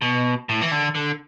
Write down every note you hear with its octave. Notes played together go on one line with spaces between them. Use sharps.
B2
A2
E3
D3
D3